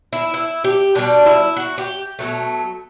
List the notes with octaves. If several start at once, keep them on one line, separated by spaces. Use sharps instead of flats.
E4
E4
G4
B2 G3 D4
E4
F#4
G4
B2 F#3 A3